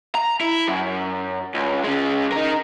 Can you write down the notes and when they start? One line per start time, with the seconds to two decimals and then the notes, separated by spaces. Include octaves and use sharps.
0.15 A#5
0.41 E4
0.68 F#2
1.54 C#2
1.84 C#3 G#3
2.32 D#4 A#4